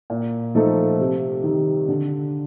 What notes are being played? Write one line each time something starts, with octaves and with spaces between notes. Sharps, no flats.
A#2
F3 A3 D#4 A4
C3
D#3 G3
D3